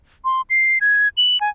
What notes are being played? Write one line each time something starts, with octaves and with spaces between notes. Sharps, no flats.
C6
C7
G#6
F#7
G#5